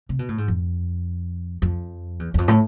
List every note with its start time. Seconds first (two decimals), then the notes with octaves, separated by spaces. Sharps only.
0.09 C3
0.19 B2
0.29 A2
0.38 G#2
0.48 F2
1.62 F2
2.19 E2
2.34 E2
2.38 F2
2.48 A2